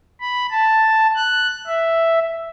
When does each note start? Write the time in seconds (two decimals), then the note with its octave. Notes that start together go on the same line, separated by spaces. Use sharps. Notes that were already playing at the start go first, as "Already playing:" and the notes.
0.21 B5
0.51 A5
1.16 F#6
1.67 E5